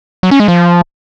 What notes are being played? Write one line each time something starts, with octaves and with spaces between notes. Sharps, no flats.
F#3
C#4
G#3
F3